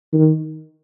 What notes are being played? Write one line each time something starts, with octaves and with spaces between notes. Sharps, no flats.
D#3